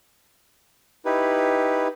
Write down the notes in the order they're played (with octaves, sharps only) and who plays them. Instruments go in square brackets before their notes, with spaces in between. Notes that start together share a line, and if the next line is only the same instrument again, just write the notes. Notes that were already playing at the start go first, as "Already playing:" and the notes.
[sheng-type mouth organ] D#4 E4 G4 B4